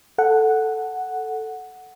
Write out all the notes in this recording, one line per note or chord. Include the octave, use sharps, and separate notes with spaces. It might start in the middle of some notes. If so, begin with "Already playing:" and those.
A4 F#5